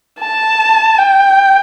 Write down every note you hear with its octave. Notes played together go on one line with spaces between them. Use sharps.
A5
G5